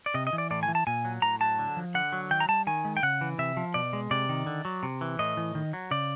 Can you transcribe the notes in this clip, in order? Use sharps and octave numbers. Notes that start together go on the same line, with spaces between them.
D5
C3 D#5
D#5
E3
D5
A2 D5
G#5
E3
A5
A#2 G#5
F#3
A2 A#5
F#3 A5
D3
F3
D3 F#5
F#3
D#3 G5
A#5
G3 A5
D#3 G#5
G#3
G5
C#3 F#5
E3
C3 E5
F3
B2 D5
G#3
C3 D5
D#3
D3
F#3
C3
E3
A2 D#5
E3
D#3
F#3
C#3 D5